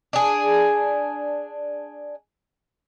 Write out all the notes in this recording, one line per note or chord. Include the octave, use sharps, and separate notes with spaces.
D4 G#4